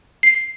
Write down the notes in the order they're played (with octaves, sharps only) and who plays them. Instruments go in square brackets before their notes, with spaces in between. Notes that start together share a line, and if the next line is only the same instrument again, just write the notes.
[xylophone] C7